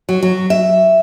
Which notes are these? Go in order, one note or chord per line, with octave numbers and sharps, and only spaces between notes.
F#3
F#3
E5